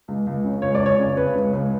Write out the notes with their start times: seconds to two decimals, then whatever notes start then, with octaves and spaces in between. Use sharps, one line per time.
0.08 C#2
0.27 C#2
0.44 C#3
0.62 C#2 C#5
0.75 D5
0.81 C#2
0.86 C#5
0.99 C#3
1.17 C#3 B4
1.35 C#2
1.53 C#2